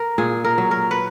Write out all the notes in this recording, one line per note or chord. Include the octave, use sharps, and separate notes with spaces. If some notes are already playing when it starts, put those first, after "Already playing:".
Already playing: A#4
A#2 G#4
A#4
F#3
A#4
B4